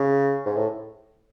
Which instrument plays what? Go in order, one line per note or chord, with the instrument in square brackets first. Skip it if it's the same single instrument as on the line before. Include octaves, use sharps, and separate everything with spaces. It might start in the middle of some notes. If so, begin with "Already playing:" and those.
Already playing: [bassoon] C#3
G#2
A2